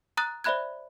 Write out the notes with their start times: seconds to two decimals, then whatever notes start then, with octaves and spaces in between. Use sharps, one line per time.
0.17 A#5 D#6 F#6 A6
0.44 C5 D5 E5 B5 F#6 G#6